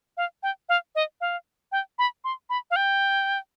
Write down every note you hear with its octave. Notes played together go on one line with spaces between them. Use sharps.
F5
G5
F5
D#5
F5
G5
B5
C6
B5
F5
G5